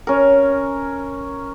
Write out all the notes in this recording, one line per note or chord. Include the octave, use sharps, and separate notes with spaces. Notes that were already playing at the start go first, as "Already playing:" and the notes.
C#4 A#4